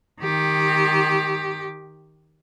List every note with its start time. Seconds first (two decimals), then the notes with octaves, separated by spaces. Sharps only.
0.22 D#3 G4